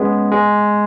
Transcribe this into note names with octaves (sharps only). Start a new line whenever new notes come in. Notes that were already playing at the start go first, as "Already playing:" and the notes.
Already playing: G#3 B3 C#4
G#3